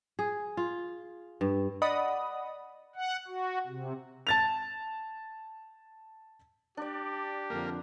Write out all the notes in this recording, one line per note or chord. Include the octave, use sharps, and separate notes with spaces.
G#4
F4
G2
D5 D#5 F#5 B5 D#6
F#5
F#4
C3
A5 A6 F7
D4 G4 D5
F2 D3 A#3